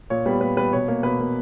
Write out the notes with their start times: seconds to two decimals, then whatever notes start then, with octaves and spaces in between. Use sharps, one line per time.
0.10 A#2 C#5
0.26 G3 B3 B4
0.41 A#2 B4
0.57 G3 B3 B4
0.73 B2 C#5
0.88 A#3 C#5
1.03 B2 B4
1.20 A#3